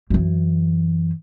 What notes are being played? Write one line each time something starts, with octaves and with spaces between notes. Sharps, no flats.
F#2 E3